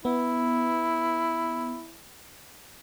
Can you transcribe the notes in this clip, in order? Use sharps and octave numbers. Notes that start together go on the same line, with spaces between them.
B3 E4